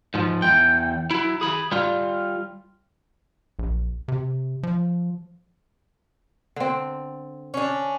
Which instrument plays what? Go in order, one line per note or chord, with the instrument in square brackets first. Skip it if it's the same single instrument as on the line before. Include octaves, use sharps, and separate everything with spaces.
[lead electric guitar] G#2 F3
E2 G5
F#3 E4
G#4 B5
G3 F4
[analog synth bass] A#1
C3
F3
[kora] D3 C4
[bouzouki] C#4 D4